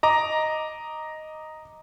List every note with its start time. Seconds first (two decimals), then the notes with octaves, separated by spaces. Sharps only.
0.03 D#5 A#5 D6